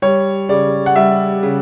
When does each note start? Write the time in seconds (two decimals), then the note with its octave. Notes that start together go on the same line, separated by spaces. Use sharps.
0.02 G3 C#5
0.49 C#3 D5
0.86 F#5
0.96 G3 E5
1.43 C#3